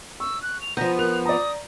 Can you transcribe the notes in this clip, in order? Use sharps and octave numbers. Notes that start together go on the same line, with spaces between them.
C#6 E6
F#6
F7
F3 B3 A#5 G6
F4 A#4 F#6 F7
D5 A#5 D#6